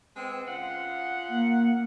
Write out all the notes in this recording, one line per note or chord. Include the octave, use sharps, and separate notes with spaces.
G#3 B3 C4
C#3 F4 F#5
A#3